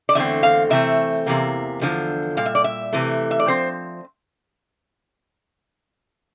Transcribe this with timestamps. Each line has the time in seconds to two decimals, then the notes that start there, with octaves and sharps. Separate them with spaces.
0.09 D5
0.15 E2 D3 A3 C4 E5
0.43 F5
0.70 C3 E3 A3 C4 E5
1.26 E2 C3 E3 A#3
1.81 E2 D3 F3
2.37 A#2 G3 F5
2.46 E5
2.55 D5
2.64 E5
2.93 C3 E3 A3
3.31 E5
3.40 D5
3.48 F3 C4 C5